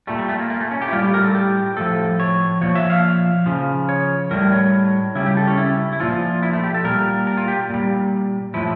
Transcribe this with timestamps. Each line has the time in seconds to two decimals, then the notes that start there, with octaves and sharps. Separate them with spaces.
0.07 A#2 G3 A3
0.19 G3
0.29 A3
0.39 A#3
0.50 A#3
0.61 A3
0.71 C#4
0.82 G4
0.88 E4
0.92 A2 G3 F4
1.03 G4
1.14 A#4
1.24 A4
1.35 G4
1.77 A2 F3 A4
2.20 C#5
2.61 A#2 F3 C#5
2.75 E5
2.90 F5
3.46 C#3 F3
3.89 C#5
4.31 A2 G3 A#4
4.52 C#5
5.15 C#3 G3 E4
5.26 G4
5.37 A4
5.47 C#4
5.58 E4
5.93 E4
6.00 A#2 F3 F4
6.43 E4
6.53 A3
6.63 G4
6.74 A4
6.84 A#2 G3 A#4
7.27 A#4
7.37 F4
7.48 G4
7.70 A#2 G3
8.54 A2 F3 E4